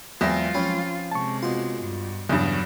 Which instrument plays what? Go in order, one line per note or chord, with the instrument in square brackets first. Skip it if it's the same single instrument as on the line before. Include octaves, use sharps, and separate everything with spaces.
[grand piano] E2 E5 A#6 [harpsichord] E3 C4 [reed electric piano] F#3 G#3 [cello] F4
[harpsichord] F3 C4 B5 [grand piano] C#4
[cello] C3 G#3 [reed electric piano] A5 C#6
[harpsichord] B2 C6 [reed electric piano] F4
[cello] G2
[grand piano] E2 G2 [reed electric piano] C#3 D#6 [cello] F#3